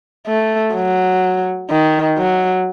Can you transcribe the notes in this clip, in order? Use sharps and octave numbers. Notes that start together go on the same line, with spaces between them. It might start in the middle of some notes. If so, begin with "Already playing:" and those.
A3
F#3
D#3
F#3